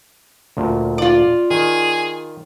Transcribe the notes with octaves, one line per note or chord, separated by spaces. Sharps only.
D2 A#2
F4 D5
D#3 G#4